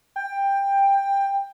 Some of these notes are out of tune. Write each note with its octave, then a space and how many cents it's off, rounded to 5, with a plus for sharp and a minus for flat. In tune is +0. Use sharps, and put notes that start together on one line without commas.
G5 +15